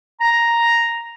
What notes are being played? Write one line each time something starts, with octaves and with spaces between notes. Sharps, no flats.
A#5